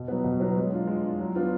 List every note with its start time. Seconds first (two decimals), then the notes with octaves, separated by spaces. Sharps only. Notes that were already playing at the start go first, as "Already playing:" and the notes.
Already playing: B2
0.08 F#3 B3
0.24 B2
0.40 F#3 B3
0.56 G#3
0.71 D4 F4
0.87 G#3
1.03 D4 F4
1.19 F#3
1.35 B3 D4 F4